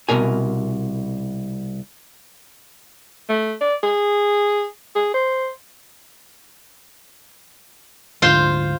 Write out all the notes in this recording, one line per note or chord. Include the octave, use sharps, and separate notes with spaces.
C2 F#2 B2 A#4 G#5
A3
D5
G#4
G#4
C5
D2 G#2 D3 F4 C5 C6